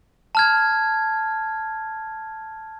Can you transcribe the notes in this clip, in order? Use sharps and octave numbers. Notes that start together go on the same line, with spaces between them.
A5 F6 G#6